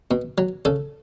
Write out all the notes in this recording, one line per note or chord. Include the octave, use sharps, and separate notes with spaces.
B2
F#3
C#3 A4